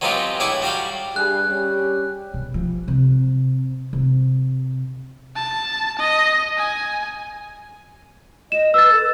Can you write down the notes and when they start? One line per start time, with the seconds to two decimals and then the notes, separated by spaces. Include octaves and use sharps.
0.01 F#3 G#3 B3 C4 F4 G4
0.40 A2 D4 E4 G#4 C#6 D6
0.62 G3 F#4 F5 G5
1.16 G2 G3 G#4 F#6
1.50 G3 C#4 G4
2.34 B2
2.54 F3
2.88 C3
3.93 C3
5.36 A5
5.98 D#5
6.58 G#5
8.52 D#5 E7
8.74 B4 E6 A6
8.92 A4